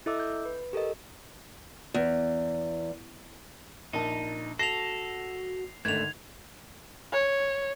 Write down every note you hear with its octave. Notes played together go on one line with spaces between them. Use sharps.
E4 A4 D#5 E5 D6 E6
G6
B4
G4 A4 A#4 D#5
E2
A#1 D#4 A#4 A5
F#4 A4 A#6 C7 F7
G#1 D3 A3 G#6 F7
C#5